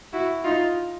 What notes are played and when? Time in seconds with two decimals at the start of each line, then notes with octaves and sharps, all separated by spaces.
0.13 E4 F#4
0.44 D#4 F4